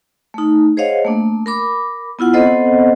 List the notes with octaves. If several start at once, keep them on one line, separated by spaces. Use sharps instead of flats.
A3 D#4
G#4 C5 C#5 D#5 F5 F#5
A3 A#3 D4
A#4 B5 D6
B3 E4 F4 F#5
B3 C4 A4 C5 D#5 F#5